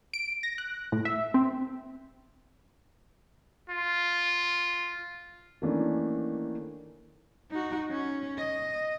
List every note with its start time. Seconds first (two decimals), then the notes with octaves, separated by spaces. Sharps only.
0.14 D7
0.43 A#6
0.58 F#6
0.92 A2
1.05 E5
1.34 C4
3.69 F4
5.62 D#3 E3 A3 A#3 C#4 D4
7.51 D#4 F#4
7.91 C#4
8.39 D#5